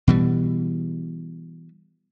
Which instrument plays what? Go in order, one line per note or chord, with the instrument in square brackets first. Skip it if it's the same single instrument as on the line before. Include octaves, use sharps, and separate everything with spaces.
[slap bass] B2 E3 G3